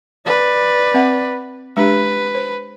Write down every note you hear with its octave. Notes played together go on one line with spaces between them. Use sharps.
B4 D5
C4 E5 F#5
G#3 D4 G4 B4
C5